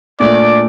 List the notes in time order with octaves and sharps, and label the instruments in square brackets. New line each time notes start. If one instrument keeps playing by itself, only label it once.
[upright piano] A#2 A3 D4 [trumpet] D5